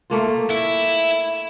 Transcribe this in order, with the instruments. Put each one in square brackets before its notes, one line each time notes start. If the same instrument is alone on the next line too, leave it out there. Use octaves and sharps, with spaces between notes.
[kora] A3 A#3 F4
[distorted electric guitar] E4